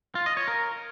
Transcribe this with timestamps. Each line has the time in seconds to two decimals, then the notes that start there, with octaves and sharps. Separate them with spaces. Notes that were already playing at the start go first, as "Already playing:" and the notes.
0.15 F4
0.26 D#5
0.37 C#5
0.48 A#4